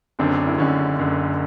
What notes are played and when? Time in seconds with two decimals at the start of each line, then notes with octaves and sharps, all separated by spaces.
0.19 F#1 F#2 D3 C4 D4
0.47 E4
0.58 F#1 F#2 D3 C#4 D#4
0.99 F#1 F#2 D3